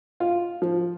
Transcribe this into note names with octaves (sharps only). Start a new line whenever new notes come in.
F4
F3